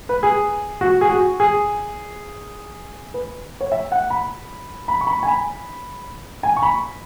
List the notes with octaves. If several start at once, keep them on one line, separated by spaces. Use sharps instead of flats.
B4
G#4
F#4
G#4
F#4
G#4
B4
C#5
E5
F#5
B5
B5
C#6
B5
G#5
B5
G#5
C#6
B5